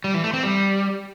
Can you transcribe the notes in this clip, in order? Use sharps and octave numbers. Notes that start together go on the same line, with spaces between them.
G3
E3
A3
C4
G3